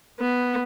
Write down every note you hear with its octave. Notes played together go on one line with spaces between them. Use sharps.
B3